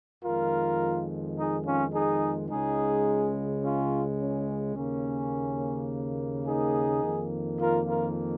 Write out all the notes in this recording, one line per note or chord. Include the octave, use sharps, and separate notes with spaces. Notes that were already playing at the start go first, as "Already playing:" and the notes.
F2 D#3 G#3 F4 A#4
D#4 G#4
C#4 F4
D#4 G#4
C#2 C#3 G#3 D#4 G#4
C#4 F4
C#4
D#2 C#3 A#3 C#4
D#4 G#4
F2 D#3 A#3
F4 A#4
F4 A#4